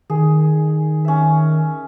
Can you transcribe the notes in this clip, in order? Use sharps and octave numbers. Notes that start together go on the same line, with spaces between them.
D#3 G#4
C#4 E5